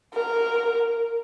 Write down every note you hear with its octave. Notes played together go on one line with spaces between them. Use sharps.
A#4